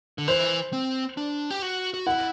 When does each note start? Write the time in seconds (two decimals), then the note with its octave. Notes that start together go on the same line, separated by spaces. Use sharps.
0.18 D3
0.28 E3 C5
0.73 C4
1.17 D4
1.51 G4
1.62 F#4
1.94 F#4
2.06 E4 F#5